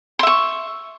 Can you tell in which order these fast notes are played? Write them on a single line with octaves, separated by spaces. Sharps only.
C6 E5 C#6